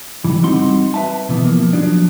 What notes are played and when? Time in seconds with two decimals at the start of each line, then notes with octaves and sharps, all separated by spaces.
0.24 C#2 G2 E3
0.43 G3 C4 D#4 F#4 C6
0.94 B4 E5 A5
1.29 B2 E3 B3
1.45 F3 A#3
1.73 F3 F#3 D4